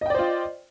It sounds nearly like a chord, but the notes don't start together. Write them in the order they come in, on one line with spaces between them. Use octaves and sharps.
D#5 G5 D5 C5 F4